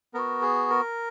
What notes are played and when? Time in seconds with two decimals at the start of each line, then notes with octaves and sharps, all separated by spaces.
0.14 B3 F#4 A#4
0.42 G#4
0.70 A#4